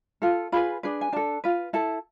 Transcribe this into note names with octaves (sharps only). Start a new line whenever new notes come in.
F4 A4
F4 G#4 B4 B5
D4 G#4 B4
G#5
D4 A4 A5
F4 B4
E4 A4 A5